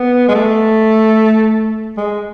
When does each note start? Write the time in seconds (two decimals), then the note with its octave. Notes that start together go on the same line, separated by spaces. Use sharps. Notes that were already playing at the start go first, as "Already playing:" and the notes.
Already playing: B3
0.28 G#3
0.35 A3
1.97 G#3